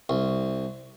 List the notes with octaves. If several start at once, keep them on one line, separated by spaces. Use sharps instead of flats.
C2